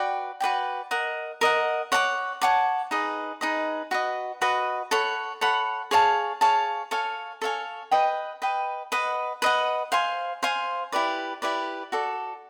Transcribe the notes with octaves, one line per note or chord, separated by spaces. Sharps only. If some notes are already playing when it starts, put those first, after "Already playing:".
Already playing: F#4 B4 D5 G5
F#4 B4 D5 G5
A#4 D#5 F#5
A#4 D#5 F#5
C#5 F#5 A5 D6
C#5 F#5 A5 D6
D#4 G#4 B4 D#5
D#4 G#4 B4 D#5
F#4 B4 D#5
F#4 B4 D#5
A4 C#5 F#5 B5
A4 C#5 F#5 B5
G#4 C#5 F5 A5
G#4 C#5 F5 A5
A4 C#5 F5 G#5
A4 C#5 F5 G#5
B4 D#5 G5
B4 D#5 G5
B4 D#5 F#5
B4 D#5 F#5
C5 F5 G#5 C6
C5 F5 G#5 C6
E4 G4 B4 D5
E4 G4 B4 D5
F#4 A4 D5